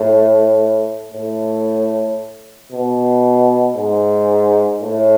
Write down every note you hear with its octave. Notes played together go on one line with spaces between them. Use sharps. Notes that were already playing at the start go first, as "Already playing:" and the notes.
Already playing: A2
A2
B2
G#2
A2